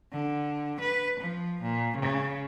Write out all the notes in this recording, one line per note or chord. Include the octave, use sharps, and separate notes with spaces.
D3
B4
F3
A#2
C#3